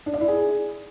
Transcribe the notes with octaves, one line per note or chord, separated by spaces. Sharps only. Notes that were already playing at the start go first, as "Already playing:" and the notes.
D4
D5
E4
G#4